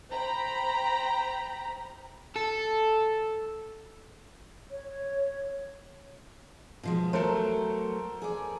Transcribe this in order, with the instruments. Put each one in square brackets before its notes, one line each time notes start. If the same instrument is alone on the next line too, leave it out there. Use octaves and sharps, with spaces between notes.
[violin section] C5 G5 A#5 B5
[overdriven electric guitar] A4
[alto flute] C#5
[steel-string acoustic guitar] B2 F3 G#3
[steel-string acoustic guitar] F#3 A3 [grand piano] A4 A#4 C5
[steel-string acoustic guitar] G#4 D5